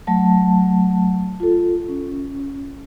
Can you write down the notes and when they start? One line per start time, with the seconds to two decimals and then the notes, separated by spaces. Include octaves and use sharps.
0.07 F#3 A3 A5
1.40 F4 A4
1.88 C#4